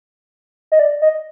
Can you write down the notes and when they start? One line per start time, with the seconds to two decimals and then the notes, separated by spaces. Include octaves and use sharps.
0.72 D#5
0.79 D5
1.02 D#5